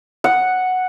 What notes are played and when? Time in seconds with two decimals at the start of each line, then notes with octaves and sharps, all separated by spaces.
0.24 F#5